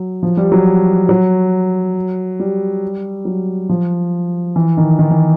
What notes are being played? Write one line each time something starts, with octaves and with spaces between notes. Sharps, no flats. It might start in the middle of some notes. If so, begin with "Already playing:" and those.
Already playing: F#3
F3
G3
F#3
F#3
G3
F#3
F3
E3
D#3
D#3
E3